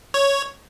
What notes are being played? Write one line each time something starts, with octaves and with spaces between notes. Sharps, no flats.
C#5